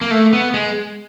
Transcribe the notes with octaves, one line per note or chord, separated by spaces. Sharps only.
A#3
A3
B3
G#3